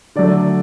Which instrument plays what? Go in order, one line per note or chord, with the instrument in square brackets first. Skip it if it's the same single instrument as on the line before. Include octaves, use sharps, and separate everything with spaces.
[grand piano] D3 F#3 A3 D5